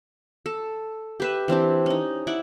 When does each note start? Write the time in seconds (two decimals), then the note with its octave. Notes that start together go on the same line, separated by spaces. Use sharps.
0.46 A4
1.20 G4 B4 E5
1.48 E3 C4 D4 G4
1.86 C#4 D#4
2.27 E4 D5 F#5